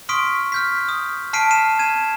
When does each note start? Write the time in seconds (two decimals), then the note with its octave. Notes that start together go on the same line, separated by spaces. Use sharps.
0.09 C6 C#6 D#6 F6 B6 D7
0.52 F6 G6 B6
0.89 D#6
1.33 A5 F6 B6 C7 D7 D#7
1.51 C7 D#7 E7
1.79 G#6 D#7 E7